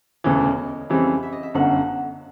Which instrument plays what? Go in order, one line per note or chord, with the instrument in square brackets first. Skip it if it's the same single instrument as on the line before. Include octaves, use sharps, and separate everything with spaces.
[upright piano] E1 D2 C#3 E3 [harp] C#5
[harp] D#5
D5
D#5
[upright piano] F2 C#3 E3 G3 C4
[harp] E5
D#5
E5
[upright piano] G1 F#2 D3 [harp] F#5